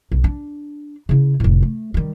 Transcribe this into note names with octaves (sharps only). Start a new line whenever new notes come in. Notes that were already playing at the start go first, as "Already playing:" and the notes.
B1
D4
C#3 E4
F1 A2
A3
D#3 G3